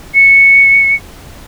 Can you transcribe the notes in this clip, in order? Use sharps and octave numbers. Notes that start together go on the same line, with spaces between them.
C#7